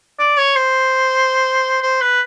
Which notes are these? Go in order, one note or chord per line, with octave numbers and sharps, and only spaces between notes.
D5
C#5
C5
C5
B4